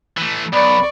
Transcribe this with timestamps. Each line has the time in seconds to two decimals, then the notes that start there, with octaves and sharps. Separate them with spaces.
0.17 E3 A3
0.53 B1 D5 B5 C#6